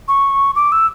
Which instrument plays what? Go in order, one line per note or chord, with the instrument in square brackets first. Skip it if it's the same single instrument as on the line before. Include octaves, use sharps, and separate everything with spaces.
[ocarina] C#6
D6
E6